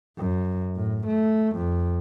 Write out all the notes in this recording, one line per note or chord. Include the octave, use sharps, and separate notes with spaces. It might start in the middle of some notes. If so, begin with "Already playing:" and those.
F#2
A2
A3
F2